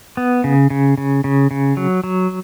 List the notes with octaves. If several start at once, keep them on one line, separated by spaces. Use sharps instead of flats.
B3
C#3
C#3
C#3
C#3
C#3
F#3
F#3